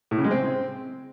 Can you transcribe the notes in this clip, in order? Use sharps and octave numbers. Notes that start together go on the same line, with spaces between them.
A2
C#3
G#3
C4